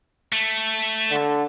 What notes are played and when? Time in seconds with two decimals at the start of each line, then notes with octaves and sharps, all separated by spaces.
0.33 A3
1.11 D3